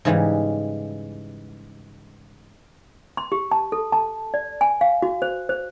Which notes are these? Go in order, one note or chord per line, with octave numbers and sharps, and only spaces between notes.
G#2 C#3 E3 G3 G#3
C6
G4
A5
A4
A5
D5
G#5
F5
F#4
C5
C5